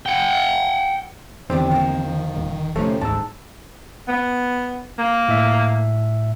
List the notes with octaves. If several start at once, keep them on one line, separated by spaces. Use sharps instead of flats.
F#5 G5
E2 D3 D#3 G3 C4 D4 G4
F3 A#3
D#1
C3 F3 A3 C#4 D#4
G#1 D2 G#2 A5 E6
B3
A#3
A2 E5